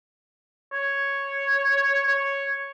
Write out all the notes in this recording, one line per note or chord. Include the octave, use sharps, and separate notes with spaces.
C#5
C#5